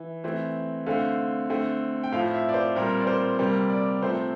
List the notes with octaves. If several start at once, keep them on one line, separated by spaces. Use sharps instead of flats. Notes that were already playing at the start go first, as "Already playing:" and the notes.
Already playing: E3
E3 A3 C4
D3 A3 C4 F5
D3 A3 C4
G5
A2 F3 C4 F5
E5
D5
C5
A#2 G3 C4 A#4
D5
C5
C3 G3 A#3 C5
D5
C3 F3 A3 C4 C5